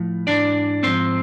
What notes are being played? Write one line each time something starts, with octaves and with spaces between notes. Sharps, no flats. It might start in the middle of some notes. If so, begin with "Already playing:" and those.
Already playing: A2 F3
G#2 E3 D4 D5
G#2 F3 C4 C5